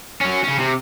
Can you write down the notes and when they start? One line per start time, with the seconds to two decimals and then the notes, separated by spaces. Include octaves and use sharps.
0.21 F#3 C#4
0.44 C#3 C#4
0.59 C3